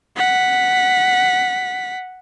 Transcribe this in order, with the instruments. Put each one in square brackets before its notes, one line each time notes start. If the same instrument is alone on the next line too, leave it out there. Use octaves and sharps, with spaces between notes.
[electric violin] F#5 B6